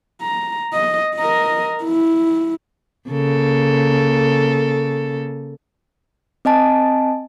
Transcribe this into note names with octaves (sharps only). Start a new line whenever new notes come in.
A#5
D#5
A#4 D#5
E4
C#3 A#3 A4
C4 D#5 G#5 A5